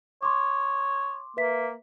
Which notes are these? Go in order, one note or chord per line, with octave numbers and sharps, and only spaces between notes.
C#5 C6 D6
A#3 B4 E5 B6